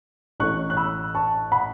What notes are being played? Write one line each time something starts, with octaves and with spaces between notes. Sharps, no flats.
A1 A2 A3 C#6 F#6
F#6
B5 E6
A5 C#6
F#5 B5